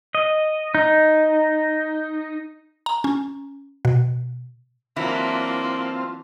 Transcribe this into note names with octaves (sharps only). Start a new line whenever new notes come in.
D#5
D#4
A#5
C#4
B2
E3 F#3 A#3 C4 D4 E4 F4